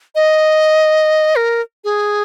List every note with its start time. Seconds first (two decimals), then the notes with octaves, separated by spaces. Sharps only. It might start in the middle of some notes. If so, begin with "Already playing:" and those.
0.15 D#5
1.36 A#4
1.84 G#4